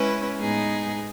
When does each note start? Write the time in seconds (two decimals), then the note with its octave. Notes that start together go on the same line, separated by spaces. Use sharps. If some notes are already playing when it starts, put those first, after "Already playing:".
Already playing: G#3 C#4 E4 B4
0.40 A2 G#3 B3 D#4 G#4